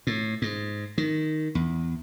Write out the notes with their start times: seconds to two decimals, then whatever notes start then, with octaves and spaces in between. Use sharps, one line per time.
0.07 A2
0.42 G#2
0.98 D#3
1.55 E2